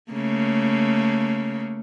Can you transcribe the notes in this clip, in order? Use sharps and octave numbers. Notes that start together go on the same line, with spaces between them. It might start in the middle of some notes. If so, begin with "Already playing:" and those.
C#3 A3 A#3